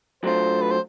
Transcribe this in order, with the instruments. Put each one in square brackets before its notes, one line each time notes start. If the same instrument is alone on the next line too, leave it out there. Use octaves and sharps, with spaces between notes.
[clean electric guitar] F#3 A3 D4 F4 [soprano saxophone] C5
[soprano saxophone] B4
C5